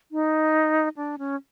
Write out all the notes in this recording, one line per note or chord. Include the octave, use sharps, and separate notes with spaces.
D#4
D4
C#4